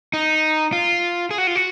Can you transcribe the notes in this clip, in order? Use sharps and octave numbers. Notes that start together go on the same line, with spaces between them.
D#4
F4
G#4
F#4
F4
F#4